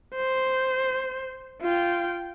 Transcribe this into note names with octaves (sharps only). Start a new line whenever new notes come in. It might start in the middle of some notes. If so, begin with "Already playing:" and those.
C5
F4 G5